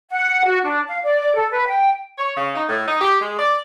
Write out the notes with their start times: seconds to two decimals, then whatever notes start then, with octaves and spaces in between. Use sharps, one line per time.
0.10 F#5
0.46 F#4
0.65 D4
0.88 F5
1.04 D5
1.34 A4
1.52 B4
1.69 G5
2.18 C#5
2.37 C#3
2.55 D#4
2.68 A2
2.88 D#4
3.01 G4
3.21 G#3
3.39 D5